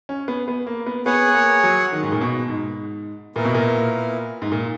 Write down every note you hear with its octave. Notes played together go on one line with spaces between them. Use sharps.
C#4
B3
B3
A#3
B3
B3 G#4 C#5 F#5
A#3
F#3
D#3
G#2
A#2
B2
G#2
A#2 B3 E4 A#4
B2
A#2
G#2
A#2